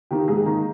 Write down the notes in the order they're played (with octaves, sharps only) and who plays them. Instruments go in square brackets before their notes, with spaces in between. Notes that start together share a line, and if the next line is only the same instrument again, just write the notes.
[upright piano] D#3 A#3 D#4 G4
G#2 G#4
D#3 A#3 D#4